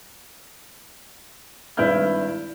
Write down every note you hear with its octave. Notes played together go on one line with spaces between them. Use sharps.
G#1 G2 E4 B4 F6 G6